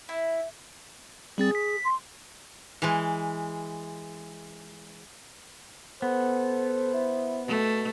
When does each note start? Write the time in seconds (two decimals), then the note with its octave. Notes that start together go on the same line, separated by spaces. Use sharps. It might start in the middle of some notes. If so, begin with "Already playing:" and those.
0.09 E4
1.38 G3 C4 G#4 A6
1.55 B6
1.84 C6
2.82 E3 G#3
6.02 B3 A4 C5
6.94 E4
7.47 B2 A3